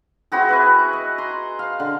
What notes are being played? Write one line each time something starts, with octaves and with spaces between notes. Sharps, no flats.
C4 E4 F#4 G#4
B4 E5 G#5
D#5
A#5 C6
F5
D3